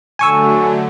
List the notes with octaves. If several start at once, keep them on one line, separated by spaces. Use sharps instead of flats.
D3 F#3 A3 G#5 C#6 E6